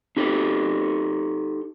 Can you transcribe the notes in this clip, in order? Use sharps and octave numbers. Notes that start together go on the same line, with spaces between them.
D#4 G4 A4